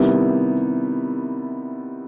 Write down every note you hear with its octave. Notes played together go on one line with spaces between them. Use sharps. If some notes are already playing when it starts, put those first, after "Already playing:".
Already playing: C3 D#3 G3 B3 E4